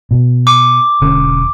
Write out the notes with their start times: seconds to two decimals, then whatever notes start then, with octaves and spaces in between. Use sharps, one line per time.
0.11 B2
0.47 D6
1.01 E1 D3 C#4